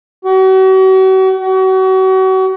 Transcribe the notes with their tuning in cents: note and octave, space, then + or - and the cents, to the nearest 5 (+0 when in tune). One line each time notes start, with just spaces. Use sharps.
F#4 +40
F#4 +35